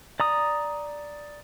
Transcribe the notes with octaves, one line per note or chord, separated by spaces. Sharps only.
D5 A#5 D#6